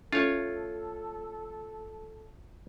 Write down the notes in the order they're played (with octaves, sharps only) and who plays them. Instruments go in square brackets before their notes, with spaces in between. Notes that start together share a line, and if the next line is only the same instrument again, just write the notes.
[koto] A3 [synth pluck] C#4 [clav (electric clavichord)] F4 C#5 [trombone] A4